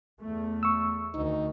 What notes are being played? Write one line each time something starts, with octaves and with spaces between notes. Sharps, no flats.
E2 A3
C#6 E6
D2 D#3 D#4